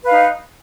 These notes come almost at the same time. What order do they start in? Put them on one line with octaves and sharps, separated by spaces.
B4 F5 D#4